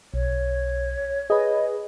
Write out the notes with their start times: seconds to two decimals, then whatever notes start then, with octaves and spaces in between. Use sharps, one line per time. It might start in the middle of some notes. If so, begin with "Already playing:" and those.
0.14 B1 C#5
1.30 G#4 B4 D#5